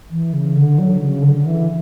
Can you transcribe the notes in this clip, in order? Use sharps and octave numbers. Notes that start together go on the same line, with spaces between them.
E3
C#3
D3
F#3
C#3
D3
E3